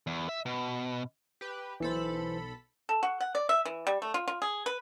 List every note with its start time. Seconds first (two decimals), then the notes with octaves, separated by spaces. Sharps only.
0.07 E2
0.29 E5
0.46 B2
1.41 G4 B4
1.80 B1 E3 A4 C5 B5
2.89 A4
3.03 F#4
3.21 F#5
3.35 D5
3.49 E5
3.65 E3
3.87 G3
4.02 A3
4.14 F4
4.28 F4
4.42 G#4
4.66 B4